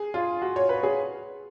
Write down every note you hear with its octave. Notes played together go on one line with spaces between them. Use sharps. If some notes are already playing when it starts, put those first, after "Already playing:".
Already playing: G#4
F4
F#4
C#5
B4
G#4